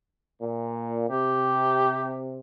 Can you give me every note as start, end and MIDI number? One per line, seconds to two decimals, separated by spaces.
0.42 1.05 46
1.09 2.39 48
1.09 2.23 67